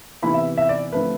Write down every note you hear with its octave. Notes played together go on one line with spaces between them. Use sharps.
C3 E3 B3 E4 B5
E5
E5
D5
D3 F3 A3 C4 B4